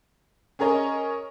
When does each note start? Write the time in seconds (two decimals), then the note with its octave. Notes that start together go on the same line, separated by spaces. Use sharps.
0.59 C#4 G#4 A#4 C#5 D#5